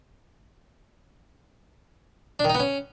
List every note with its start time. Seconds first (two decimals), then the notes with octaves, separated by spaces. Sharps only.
2.39 D4
2.45 D#3
2.50 D#4
2.55 B3
2.60 C#4